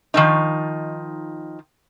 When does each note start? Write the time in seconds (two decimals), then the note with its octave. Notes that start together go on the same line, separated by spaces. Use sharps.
0.14 D#3 F3 D#4